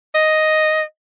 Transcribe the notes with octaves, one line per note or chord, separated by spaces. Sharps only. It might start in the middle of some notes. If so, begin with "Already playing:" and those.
D#5